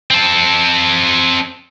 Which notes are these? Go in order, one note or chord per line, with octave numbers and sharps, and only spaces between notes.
C4 A4